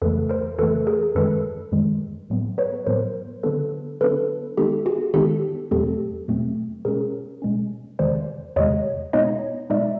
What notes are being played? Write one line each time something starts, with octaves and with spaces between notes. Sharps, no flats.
F2 C#3 E3 A3 A4 B4
A#4 C5
F2 C#3 E3 A3 A4 B4
G#4 A#4
F#2 D#3 G#3 A4 B4
F#2 D#3 G#3
A2 F#3 B3
B4 C#5
A2 F#3 B3 A#4 C5
D3 F#3 B3 D4 A4 B4
D3 F#3 B3 D4 A4 B4
D#3 G#3 B3 D#4 G4 A4
F#4 G#4
D#3 G#3 B3 D#4 G4 A4
E2 B2 F#3 A3 C4 G4 A4
E2 B2 F#3 A3 C4
B2 G#3 C#4 G#4 A#4
B2 G#3 C#4
E2 C3 D#3 G#3 C5 D5
E2 C3 D#3 G#3 C#5 D#5
B2 G#3 B3 D#4 C#5 D#5
B2 G#3 B3 D#4 D5 E5